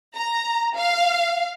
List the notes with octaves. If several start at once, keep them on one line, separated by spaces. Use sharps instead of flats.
A#5
F5